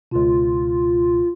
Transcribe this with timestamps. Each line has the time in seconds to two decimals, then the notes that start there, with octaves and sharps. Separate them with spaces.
0.11 C#2 B2 F4